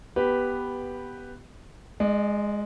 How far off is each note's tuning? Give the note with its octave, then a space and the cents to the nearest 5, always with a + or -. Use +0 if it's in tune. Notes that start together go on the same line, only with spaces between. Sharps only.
B3 -5 G4 +0 B4 +0
G#3 +0 D5 +45